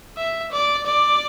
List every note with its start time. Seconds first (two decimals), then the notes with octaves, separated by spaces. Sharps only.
0.18 E5
0.52 D5
0.86 D5